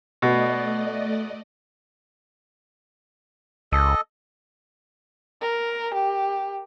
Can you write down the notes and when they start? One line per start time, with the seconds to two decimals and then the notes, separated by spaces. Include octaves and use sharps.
0.22 B2 A3 D5 D#5
3.72 C#2 A4 D#5
5.41 A#4
5.94 G4